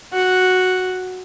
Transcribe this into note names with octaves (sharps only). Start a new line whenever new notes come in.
F#4 F#5